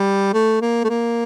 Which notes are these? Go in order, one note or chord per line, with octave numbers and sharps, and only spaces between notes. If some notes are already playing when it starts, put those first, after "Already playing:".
Already playing: G3
A3
A#3
A3
A#3